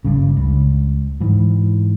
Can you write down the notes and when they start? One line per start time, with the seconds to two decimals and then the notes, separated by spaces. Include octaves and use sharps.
0.05 F#1 G2 C#3
0.37 C#2
1.20 G#2 E3